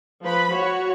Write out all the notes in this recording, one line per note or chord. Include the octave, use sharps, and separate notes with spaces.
F3 B4 B5
F#4 C#5